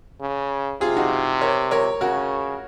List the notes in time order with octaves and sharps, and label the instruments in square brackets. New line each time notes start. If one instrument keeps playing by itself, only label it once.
[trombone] C#3
[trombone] C3 [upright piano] F4 G#4
[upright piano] D#4 F#4
A#4 C#5
A#4 C#5
[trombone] C#3 [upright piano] F#4 A#4